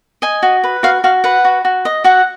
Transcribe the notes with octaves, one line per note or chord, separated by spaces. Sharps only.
D#5 G#5
F#4
B4
F#4 F5
F#4 F5
B4 F#5
F#4
F#4
D#5
F#4 F#5